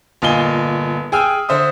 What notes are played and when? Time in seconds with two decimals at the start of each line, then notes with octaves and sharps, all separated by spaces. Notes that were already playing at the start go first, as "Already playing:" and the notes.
0.22 G1 A#2 F4 D#5 G#5 G7
1.12 G#4 G5 G#5 E6 F6
1.49 D3 C5 E5 D#6